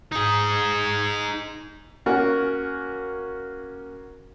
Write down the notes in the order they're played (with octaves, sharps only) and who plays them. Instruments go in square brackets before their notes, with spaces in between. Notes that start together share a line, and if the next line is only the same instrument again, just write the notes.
[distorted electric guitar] D#4 G#4
[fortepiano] A#3 C#4 F#4 A#4